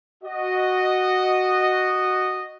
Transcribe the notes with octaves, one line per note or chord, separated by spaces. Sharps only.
F#4 D#5